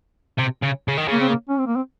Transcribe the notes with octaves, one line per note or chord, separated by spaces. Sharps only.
C3
C#3
C#3
D#3
C#3 A#3
C4
A#3
C#4
C4
A#3
C4